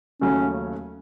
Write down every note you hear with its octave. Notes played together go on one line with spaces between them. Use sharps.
D#2 C#3 F#3 A3 C#4